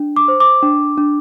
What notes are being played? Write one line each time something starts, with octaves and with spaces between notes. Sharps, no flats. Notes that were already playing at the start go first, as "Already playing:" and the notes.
Already playing: D4
D6
C5
D6
D4
D4